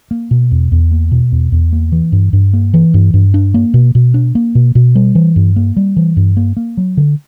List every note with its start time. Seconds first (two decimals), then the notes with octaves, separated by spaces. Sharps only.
0.11 A#3
0.31 B2
0.51 E2
0.72 E2
0.91 A#3
1.12 B2
1.32 E2
1.52 E2
1.73 A#3
1.92 E3
2.12 G2
2.33 G2
2.53 A#3
2.74 E3
2.94 G2
3.14 G2
3.34 D4
3.54 A#3
3.74 B2
3.95 B2
4.14 D4
4.35 A#3
4.55 B2
4.75 B2
4.95 G3
5.15 E3
5.36 G2
5.56 A#3
5.77 G3
5.97 E3
6.17 G2
6.37 A#3
6.57 A#3
6.77 F#3
6.97 D3